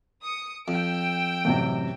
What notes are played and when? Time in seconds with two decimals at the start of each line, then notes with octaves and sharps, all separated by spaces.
0.24 D#6 C#7
0.68 F2 G5 E6 D7
1.45 A1 F#2 C3